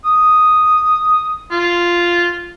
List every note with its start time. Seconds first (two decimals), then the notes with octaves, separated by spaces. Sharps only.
0.06 D#6
1.52 F4